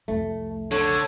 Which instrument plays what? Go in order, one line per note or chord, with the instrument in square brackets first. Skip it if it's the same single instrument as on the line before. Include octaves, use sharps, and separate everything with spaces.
[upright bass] C2 F2 [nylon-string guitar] A3
[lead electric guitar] D3 [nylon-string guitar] A4 [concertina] C#5